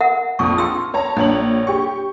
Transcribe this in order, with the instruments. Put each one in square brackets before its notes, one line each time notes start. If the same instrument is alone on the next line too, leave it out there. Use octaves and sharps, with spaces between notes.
[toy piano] A#4 E5 F#5
[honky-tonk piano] A#1 F2 D#6 [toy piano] C#6
[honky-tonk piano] F4 [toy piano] G5 C6 E6
[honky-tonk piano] C#5 A5 A#5
[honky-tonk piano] A#1 C#5 F#7 [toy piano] D4
[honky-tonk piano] G4 C#6